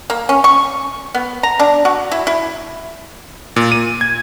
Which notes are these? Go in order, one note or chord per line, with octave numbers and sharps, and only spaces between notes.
A#3
C#4
C#6
B3
A#5
D4
F#4
E4
E4
A#2
D#7
G#6